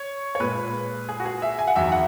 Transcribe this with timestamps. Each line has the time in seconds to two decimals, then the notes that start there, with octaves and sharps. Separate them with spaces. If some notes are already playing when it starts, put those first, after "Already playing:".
Already playing: C#5
0.35 C#5
0.40 A#2 G#3 B4
1.09 G#4
1.20 F#4
1.25 G#4
1.42 E5
1.59 G#5
1.68 F#5
1.76 E2 D#3 F#3 E5
1.92 F#5